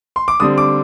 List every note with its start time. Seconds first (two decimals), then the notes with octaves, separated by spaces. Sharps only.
0.16 C6
0.28 D6
0.40 D3 G3 C4 D#6
0.58 D6